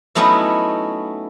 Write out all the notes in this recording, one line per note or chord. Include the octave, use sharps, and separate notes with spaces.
F#3 A3 B3 C#4 D#4 E4